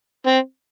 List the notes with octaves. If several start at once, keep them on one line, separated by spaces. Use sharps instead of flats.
C4